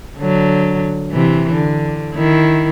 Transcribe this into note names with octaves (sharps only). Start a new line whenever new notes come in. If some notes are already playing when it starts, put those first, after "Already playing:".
D3 F#3
C3 E3
D3
D#3 E4